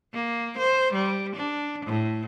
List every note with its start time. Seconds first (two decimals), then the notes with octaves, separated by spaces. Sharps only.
0.13 A#3
0.58 C5
0.93 G3
1.35 D4
1.86 A2